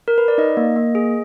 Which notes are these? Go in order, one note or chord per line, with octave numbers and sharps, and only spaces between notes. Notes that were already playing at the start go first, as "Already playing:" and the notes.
A#4
B4
D5
D#4 D#5
A#3
A#3
G#4